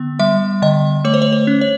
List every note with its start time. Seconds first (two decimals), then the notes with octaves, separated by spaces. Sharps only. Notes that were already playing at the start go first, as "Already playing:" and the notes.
Already playing: D3 B3
0.19 G3 E5
0.62 D3 D#5
1.05 A3 C#5
1.14 C5
1.22 C#5
1.32 C5
1.47 C#4
1.61 C#5